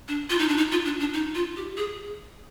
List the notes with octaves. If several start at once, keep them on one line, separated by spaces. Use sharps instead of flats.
D4
F4
D#4
D4
D#4
F4
D4
D4
D#4
F4
G4
G#4